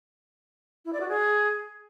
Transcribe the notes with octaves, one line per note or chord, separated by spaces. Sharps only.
E4
D5
F#4
G#4